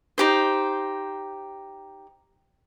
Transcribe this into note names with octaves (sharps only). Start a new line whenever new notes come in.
D#4 G4 C5